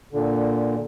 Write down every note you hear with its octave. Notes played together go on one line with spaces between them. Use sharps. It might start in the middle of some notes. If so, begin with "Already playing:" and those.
A#2 D3